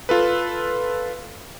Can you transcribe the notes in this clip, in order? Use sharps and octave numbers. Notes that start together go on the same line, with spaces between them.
F4 A4 B4